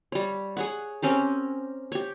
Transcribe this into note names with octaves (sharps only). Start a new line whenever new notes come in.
G3 C#5
G#4 C#5 F#5
C4 C#4 G4 A#4
G4 C#5